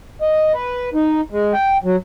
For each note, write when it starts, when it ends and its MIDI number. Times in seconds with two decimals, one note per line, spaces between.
0.21 0.52 75
0.54 0.90 71
0.94 1.21 63
1.32 1.53 56
1.53 1.77 79
1.84 1.96 54